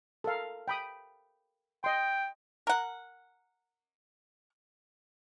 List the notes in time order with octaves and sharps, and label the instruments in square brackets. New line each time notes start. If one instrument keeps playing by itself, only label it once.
[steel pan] A4 A#4 F5
G5 B5 D#6
[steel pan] D#5 C6 [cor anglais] G5
[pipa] A#4 F#5